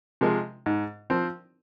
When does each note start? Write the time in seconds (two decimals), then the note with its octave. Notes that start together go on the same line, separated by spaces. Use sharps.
0.21 C3 F3 G#3
0.66 G#2
1.10 F3 C4